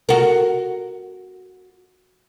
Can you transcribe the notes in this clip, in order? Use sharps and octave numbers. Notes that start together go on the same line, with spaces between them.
F#4 A#4